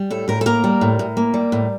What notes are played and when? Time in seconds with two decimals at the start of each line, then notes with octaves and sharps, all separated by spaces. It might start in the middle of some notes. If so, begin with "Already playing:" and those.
Already playing: G3
0.11 A2 A4
0.28 A2 A#4
0.41 A4
0.46 A#3 A#4
0.64 G3
0.81 A2
0.99 A2
1.17 A#3
1.34 G3
1.52 A2